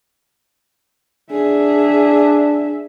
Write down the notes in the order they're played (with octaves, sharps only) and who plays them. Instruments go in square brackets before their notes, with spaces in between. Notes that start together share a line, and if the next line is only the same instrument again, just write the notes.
[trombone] D4 [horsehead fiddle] G#4 E5